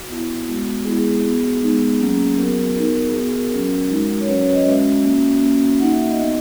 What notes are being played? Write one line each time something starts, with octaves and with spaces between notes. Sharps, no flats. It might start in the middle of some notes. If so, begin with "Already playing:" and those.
Already playing: F#4
B3 E4
G#3 B3 F#4
G#3 B3 E4 G#4
B3 F#4
G#3 B3 D#4
F#3 A#3 C#4
F#3 B3 F#4 A#4
B3 D#4 F#4 A#4
G#4
B3 F#4 G#4
A#4
F#3 C#4 F#4
G#3 D#4 F#4
C#5
F#3 C#4 F#4 B4
C#5
D#5
G#3 C#4 F#4 E5
A#3 C#4 F#4
A#3 C#4 F#4
A#3 D#4 F#4 F#5
E5
E5
D#5
B3 D#4 F#4